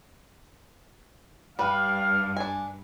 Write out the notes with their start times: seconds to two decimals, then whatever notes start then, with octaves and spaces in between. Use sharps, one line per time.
1.59 G2 G3 D4 B4 F5
2.37 D4 G#5